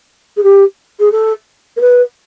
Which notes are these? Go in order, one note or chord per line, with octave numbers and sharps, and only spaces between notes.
G#4
G4
G#4
A4
A#4
B4